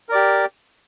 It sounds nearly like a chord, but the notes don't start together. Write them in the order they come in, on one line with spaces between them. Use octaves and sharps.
A#4 D5 G4